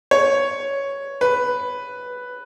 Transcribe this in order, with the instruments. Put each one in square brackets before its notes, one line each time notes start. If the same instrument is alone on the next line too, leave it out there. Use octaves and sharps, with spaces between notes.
[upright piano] C#5
B4